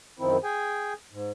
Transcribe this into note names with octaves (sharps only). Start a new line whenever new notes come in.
F#2 D#3 F3 C4 E4
G#4 G5 G#5
G#2